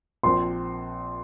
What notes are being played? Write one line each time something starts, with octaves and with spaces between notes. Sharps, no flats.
A#1 A#2 F3 C4 C6